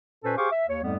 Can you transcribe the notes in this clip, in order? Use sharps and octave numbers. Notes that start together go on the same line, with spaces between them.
A#2 C#4 A4 B4 C5 G#5
G4 G#4 C5 F5 C#6 D6
E5
D#2 C#5
F2 G#2 G3 A3 B3